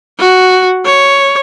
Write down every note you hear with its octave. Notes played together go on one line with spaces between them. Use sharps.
F#4
C#5